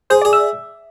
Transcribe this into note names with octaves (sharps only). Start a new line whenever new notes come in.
G#4 C5
D5
G#4
E5